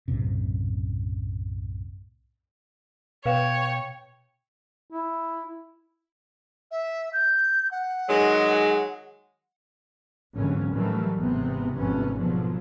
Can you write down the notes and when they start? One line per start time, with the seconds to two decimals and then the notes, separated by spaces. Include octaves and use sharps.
0.08 B1 F#2 A2 C3
3.26 B2 B4 C#5 F5 G5 E7
4.91 E4
6.71 E5
7.13 G6
7.71 F#5
8.08 D#3 F#3 G#3
10.35 G#1 D#2 D3 E3 F#3 C#4
10.71 A2 D#3 E3 F#3 G3 A3
11.17 G#1 C3 E3 B3
11.76 G#1 F2 C3 A3 B3 C#4
12.15 G#2 B2 D3 F3 F#3